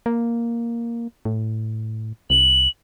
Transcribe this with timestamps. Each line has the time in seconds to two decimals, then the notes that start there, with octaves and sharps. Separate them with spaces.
0.06 A#3
1.25 A2
2.30 C2 F#7